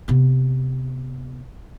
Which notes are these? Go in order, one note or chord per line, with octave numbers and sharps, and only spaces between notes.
C3 B3